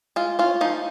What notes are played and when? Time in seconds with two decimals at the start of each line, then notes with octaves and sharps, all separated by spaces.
0.16 G#3 F4
0.39 C#4 F4
0.61 F3 D#4